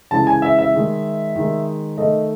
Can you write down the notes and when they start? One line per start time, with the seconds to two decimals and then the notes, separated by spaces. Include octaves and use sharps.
0.11 C#3 E3 G#3 A5
0.27 G#5
0.42 E5
0.58 E5
0.74 D#3 G#3
1.36 D#3 G#3
1.98 D#3 A3 D#5